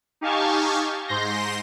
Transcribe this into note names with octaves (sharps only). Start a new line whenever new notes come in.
D#4 G4 F5 G#5 A5 C#6
G#2 C6 G6 A#6